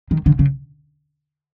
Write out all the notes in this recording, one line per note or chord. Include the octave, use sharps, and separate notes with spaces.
D#3
D3
C#3